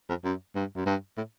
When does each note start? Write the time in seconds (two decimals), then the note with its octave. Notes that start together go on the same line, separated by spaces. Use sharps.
0.09 F2
0.24 F#2
0.55 G2
0.76 F#2
0.86 G2
1.17 A2